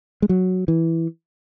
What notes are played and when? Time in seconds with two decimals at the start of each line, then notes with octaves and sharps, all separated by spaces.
0.22 G#3
0.29 F#3
0.68 E3